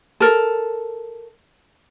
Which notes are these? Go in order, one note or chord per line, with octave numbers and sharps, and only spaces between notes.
A4 A#4